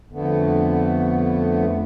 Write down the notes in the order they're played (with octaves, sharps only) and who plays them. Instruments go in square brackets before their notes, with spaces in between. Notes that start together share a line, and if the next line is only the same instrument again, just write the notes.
[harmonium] F2 D3 A3 B3